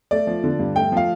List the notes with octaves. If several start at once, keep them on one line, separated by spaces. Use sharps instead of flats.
A3 D5
F3
D3
G2
A3 G5
F3 F5